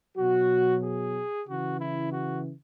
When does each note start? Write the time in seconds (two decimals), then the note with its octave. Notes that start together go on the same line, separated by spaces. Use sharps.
0.17 B2 F#3 F#4
0.83 G#4
1.47 C#3 E3 F#4
1.80 E4
2.12 F#4